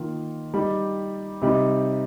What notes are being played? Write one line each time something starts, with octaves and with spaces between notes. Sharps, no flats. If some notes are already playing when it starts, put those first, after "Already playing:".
Already playing: D#3 A#3 F4
G3 D#4 G4
C3 G3 D#4